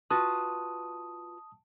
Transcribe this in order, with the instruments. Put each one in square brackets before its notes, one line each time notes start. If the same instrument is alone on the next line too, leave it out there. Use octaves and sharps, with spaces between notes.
[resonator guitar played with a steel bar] F4 F#4 B4 [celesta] A5 [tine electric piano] D#6